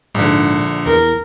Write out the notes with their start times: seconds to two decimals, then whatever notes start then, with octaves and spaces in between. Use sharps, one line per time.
0.15 A#1 G#2 D3
0.86 E2 A#4